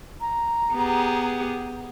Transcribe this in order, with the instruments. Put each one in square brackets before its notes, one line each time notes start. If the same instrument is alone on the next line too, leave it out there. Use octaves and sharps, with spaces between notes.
[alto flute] A#5
[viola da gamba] B3 G4 G#4